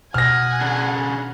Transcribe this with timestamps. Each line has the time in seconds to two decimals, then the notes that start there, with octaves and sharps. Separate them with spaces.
0.14 B2 F#5 G#5 D#6 F6 A#6
0.61 C#3 D4